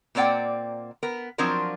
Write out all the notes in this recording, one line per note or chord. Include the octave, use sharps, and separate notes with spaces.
A#2 A#3 C4 D5 F#5 G5
B3 A#4
F3 F#3 C4 D4 F4 A#4